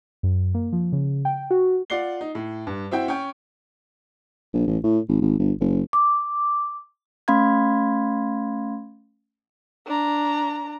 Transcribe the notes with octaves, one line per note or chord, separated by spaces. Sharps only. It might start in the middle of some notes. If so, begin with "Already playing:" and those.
F#2
A#3
F3
C#3
G5
F#4
F4 D5 F#5 C7 G7
D#4
A2
G2
C4 E4 F#4 G5
C#4 G5
A#1
A1
A2
G#1
G#1
G1
F#1
D6
A3 C#4 F5 B5 C6 G#6
D4 A#5